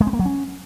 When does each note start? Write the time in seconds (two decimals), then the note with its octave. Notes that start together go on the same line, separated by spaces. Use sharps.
0.01 G#3
0.07 C4
0.13 A#3
0.19 F#3
0.26 C#4